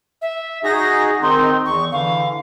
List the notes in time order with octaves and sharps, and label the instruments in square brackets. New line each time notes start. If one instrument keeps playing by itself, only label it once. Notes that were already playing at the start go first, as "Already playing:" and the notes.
[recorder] E5
[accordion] D#4 F#4 G#4 [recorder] A#6
[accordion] D#3 C4 D#4 [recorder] C6
[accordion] E2 [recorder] C#6
[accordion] D3 E3 [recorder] F5